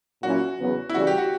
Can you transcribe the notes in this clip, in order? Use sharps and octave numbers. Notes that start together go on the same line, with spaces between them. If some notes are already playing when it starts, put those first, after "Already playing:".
A#2 F#3 C#4 E4 F#4
E2 C#3 F#3 B3
E4
C#3 E3 G3 F#4
G4
F#4